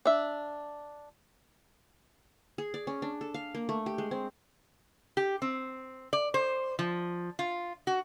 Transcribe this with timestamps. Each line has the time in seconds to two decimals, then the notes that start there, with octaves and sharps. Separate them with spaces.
0.05 D4 E5
2.58 G#4
2.74 D5
2.87 C#4
3.02 D4
3.21 A4
3.34 F5
3.55 A#3
3.69 A3
3.86 G4
3.98 G#3
4.11 C4
5.17 G4
5.42 C4
6.13 D5
6.34 C5
6.79 F3
7.39 F4
7.87 F#4